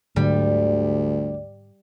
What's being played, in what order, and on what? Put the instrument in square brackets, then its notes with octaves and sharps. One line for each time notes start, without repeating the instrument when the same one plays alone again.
[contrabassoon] D2 [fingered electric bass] G#2 D3 F#3 [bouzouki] G3